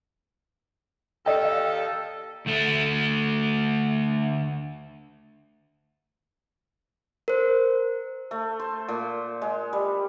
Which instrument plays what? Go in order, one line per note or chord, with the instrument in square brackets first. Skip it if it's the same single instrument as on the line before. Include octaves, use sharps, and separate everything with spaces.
[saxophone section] D#2 D#4 A4 [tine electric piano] D5 D#5 G5
[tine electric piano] F5
[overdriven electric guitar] D2 A3
[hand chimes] A#4 C5
[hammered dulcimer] A3
C5
A#2
G#3
G3